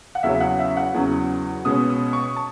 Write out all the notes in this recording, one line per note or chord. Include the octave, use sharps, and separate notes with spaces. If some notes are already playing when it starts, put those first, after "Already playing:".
F#5
E2 C#3 F#3 C#4 E5
F#5
E5
F#5
E2 C#3 F#3 C#4
B2 G#3 C#4 D#6
D#6
C#6
A5